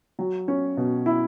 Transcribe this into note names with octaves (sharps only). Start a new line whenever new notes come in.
F#3
C#4
B2
E4